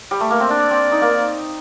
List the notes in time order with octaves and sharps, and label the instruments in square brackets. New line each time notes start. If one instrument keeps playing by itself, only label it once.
[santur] G3
A3
A#3
C4
[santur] D4 [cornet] D5
[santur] C4
D#4
A#3